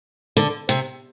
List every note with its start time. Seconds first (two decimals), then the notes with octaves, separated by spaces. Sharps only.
0.37 D3
0.69 C3